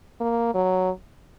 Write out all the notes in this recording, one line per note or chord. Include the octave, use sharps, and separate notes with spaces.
A#3
F#3